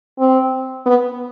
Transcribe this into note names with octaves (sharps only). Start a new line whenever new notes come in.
C4
B3